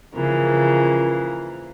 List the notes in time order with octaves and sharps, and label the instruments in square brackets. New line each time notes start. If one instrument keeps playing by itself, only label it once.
[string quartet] C#3 E3 F3 A#3